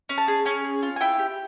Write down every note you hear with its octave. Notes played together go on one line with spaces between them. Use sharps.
C#4
A5
G#4
C#4 G#5
G#4
F4
G#5
E4 G5
G4